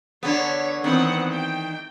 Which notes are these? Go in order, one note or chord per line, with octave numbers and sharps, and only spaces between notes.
D3 B3 C#5
D#3 E3 B3 C4 F#5
G5